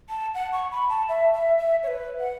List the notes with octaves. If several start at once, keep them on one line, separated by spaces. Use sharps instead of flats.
A5
F#5
C#6
B5
A5
E5
E5
E5
C#5
B4
F#5